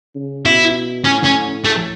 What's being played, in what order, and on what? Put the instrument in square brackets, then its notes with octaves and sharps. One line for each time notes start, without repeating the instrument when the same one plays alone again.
[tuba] C#3
[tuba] B2 [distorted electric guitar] E4
[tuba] A2 [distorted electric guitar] C#4
[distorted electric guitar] C#4
A3